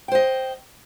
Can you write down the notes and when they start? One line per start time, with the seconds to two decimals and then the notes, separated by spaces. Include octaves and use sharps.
0.08 G5
0.12 C5
0.15 D#5